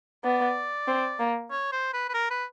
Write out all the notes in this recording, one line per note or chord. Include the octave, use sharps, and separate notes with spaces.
B3 D5
C4
A#3
C#5
C5
B4
B4
A#4
B4